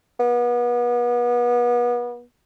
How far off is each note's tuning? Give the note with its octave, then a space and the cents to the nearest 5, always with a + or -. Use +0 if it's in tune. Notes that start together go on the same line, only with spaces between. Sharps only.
B3 -30